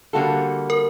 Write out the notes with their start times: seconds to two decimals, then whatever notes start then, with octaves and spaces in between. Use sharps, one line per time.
0.13 D3 G3 A#3 F#4 A4
0.70 A#4